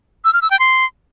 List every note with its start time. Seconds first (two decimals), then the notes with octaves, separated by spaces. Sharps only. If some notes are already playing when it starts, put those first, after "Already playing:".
0.25 E6
0.33 F6
0.42 E6
0.51 G5
0.59 C6